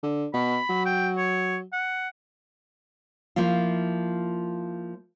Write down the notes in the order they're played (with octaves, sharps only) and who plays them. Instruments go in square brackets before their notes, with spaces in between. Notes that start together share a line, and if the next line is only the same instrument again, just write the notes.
[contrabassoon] D3
[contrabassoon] B2 [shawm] B5
[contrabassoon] F#3
[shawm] G5
C#5
F#5
[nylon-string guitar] F3 A#3 E4 F4